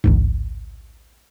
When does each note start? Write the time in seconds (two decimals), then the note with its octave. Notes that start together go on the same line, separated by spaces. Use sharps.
0.04 A1 D2 G#2